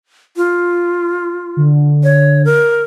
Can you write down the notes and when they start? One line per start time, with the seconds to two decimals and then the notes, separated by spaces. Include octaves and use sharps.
0.36 F4
1.57 D3
2.03 C#5
2.45 A#4